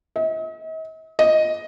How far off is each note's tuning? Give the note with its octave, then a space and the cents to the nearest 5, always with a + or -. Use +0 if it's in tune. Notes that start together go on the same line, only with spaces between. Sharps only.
D#5 +45
D#5 +0